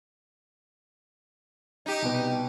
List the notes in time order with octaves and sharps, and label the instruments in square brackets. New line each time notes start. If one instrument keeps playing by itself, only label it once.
[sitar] D#4 G4
[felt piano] C2 B2 B4